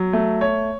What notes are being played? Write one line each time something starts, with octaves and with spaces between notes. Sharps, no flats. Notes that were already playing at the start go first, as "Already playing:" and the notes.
Already playing: F#3
A3
C#5